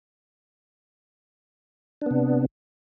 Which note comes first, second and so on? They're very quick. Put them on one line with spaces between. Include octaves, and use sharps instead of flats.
D4 B3 C3